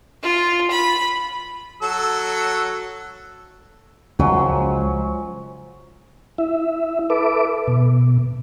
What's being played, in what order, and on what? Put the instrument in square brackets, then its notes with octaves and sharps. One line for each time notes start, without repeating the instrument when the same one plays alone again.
[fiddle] F4
B5
[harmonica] F#3 A4 E6
[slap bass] C#2 [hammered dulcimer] F3 F#3 C#4
[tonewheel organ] E4 E5
A4 B4 E5 D6
B2